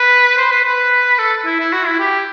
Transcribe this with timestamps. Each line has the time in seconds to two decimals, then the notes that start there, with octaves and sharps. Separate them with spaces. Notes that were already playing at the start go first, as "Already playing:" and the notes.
Already playing: B4
0.37 C5
0.51 B4
0.64 B4
1.18 A4
1.45 E4
1.60 E4
1.72 F#4
1.86 E4
1.99 G4